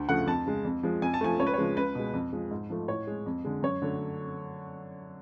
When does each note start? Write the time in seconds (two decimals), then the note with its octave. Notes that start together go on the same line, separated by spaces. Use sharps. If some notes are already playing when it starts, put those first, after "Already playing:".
Already playing: D2
0.08 C#3 F3 A3 F#5
0.27 F2 A5
0.46 C#3 G#3
0.65 F2
0.83 F3 G#3
1.02 F2 G#5
1.14 A5
1.21 F3 A3 G#5
1.39 C#2 C#5
1.47 B4
1.54 C#5
1.58 C#3 F3 G#3
1.77 C#2 B4
1.95 B2 G#3
2.14 F2
2.33 F3 G#3
2.51 G#2
2.70 F3 A3
2.88 A2 C#5
3.07 G#3
3.26 F2
3.45 D3 G#3
3.63 F#2 C#5
3.82 D3 F#3 A3